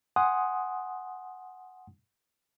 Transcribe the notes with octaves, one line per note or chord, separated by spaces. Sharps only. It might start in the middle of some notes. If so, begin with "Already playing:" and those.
F#5 G#5 C6 D#6